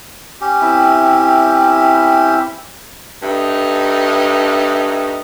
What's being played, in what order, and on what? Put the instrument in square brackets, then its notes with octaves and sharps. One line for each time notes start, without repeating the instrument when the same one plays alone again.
[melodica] C#4 G4
[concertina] C4 E4 E5
[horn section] G2 A3 D#4